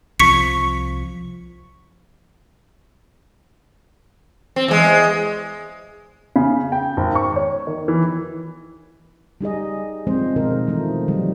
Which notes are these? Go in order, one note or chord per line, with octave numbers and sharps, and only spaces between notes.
C2 F3 C#6 B6 C#7
C4
E2 G#3
C#3
G5
G#1
C#6
C#5
D#3
E3
G3 D#4 G#4 D#5
F3 G#3 C4 C5
B2 D#3 D#4 A#4
E3 F3 A3 D#4
D#3 F#3 G3